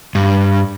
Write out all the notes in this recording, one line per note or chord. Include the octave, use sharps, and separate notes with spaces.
G2